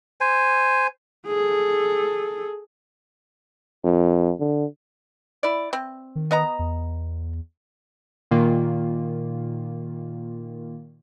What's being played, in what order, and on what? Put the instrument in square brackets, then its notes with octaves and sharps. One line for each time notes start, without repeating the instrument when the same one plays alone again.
[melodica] C5 G#5
[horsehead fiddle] G#4 A4
[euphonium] F2
D3
[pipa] E4 D5
C4
[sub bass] D#3
[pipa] B3 D#5 A#5
[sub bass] E2
[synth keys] A#2 D#3 A#3 F4